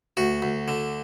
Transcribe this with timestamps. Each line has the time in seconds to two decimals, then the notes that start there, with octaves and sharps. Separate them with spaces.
0.17 D2 F#4
0.42 D2
0.68 D3